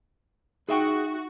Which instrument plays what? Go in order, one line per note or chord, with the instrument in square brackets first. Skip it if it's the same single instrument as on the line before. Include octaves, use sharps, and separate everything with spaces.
[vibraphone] D#4 [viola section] F#4 [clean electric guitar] G#4 E5 G5